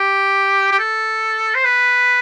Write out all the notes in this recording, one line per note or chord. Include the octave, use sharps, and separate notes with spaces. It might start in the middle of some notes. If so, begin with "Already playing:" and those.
Already playing: G4
G4
A4
C5
B4